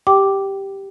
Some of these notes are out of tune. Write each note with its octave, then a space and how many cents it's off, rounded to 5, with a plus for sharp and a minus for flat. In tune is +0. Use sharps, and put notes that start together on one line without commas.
G4 +0 G5 -15 D6 +0